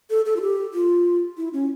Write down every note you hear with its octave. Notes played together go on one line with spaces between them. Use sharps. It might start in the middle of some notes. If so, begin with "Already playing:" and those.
A4
A4
F4
G4
F4
E4
C#4